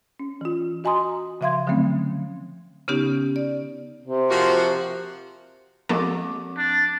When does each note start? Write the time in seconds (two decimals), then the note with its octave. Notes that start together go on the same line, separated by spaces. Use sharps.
0.19 C#4
0.41 E3 F4
0.84 F#4 D#5 G#5 A#5 C6 D#6
1.41 C#3 F3 E5 F5 C6 G#6
1.67 D3 F3 F#3 A3 C4 C#4
2.88 C#3 B3 C#4 D#4 G4
3.36 D5
4.02 C3
4.30 F3 A#3 F#4
5.89 F3 G#3 A#3 C4 A4 D6
6.58 D4